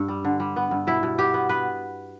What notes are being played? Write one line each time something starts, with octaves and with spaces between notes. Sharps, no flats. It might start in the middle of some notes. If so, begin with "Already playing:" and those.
Already playing: G2
G3
D3
G3
B3
G2
B2 E4
B2
B3 G4
B3
B3 B4